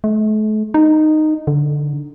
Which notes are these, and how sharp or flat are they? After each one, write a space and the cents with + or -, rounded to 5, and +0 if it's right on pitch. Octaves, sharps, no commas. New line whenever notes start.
A3 -40
D#4 -10
D3 -5